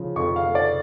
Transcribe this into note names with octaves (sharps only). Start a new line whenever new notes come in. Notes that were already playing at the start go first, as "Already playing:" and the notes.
Already playing: C#3 F3
F2 C#6
F5
A3
D5